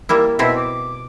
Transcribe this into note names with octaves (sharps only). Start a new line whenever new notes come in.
G3 A#3 E4
B2 C4 E4 E5
D6